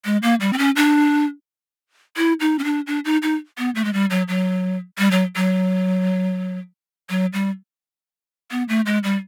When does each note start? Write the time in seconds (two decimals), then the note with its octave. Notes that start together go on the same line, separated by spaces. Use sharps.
0.05 G#3
0.23 A#3
0.41 G3
0.53 C4
0.58 C#4
0.76 D4
2.17 E4
2.40 D#4
2.59 C#4
2.64 D4
2.87 D4
3.05 D#4
3.23 D#4
3.58 B3
3.75 A3
3.85 G#3
3.93 G3
4.10 F#3
4.28 F#3
4.98 G3
5.11 F#3
5.36 F#3
7.10 F#3
7.33 G3
8.51 B3
8.69 A3
8.86 G#3
9.04 G3